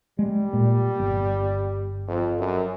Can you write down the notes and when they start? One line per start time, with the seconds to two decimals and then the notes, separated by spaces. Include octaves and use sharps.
0.19 G3 G#3
0.53 A#2
1.00 G1
2.08 F2
2.39 F#2